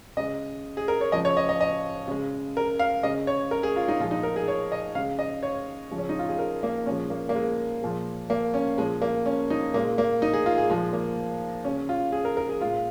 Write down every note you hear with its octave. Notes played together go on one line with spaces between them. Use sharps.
C#3 G#3 D#5
G#4
A#4
C#5
C#3 F3 G#3 D#5
C#5
D#5
D#5
D#5
C#3 G#3
A#4
F5
C#3 G#3 D#5
C#5
A#4
G#4
F4
D#4
A#2 F3 G#3 F4
D#4
A#4
G#4
C#5
D#5
C#3 G#3 F5
D#5
C#5
C#3 F3 G#3
C#4
D#4
F4
G#4
A#4
A#3
A#2 F3 G#3 C#4
A#3
A#3
G#3
A#2 F3 G#3
A#3
C#4
A#2 F3 G#3
A#3
C#4
D#4
A#2 G#3 A#3
A#3
D#4
G#4
F4
G#4
A#2 F3 G#3
A#3
C#3 G#3 C#4
F4
G#4
A#4
A#4
G#4
A#2 G#3 F4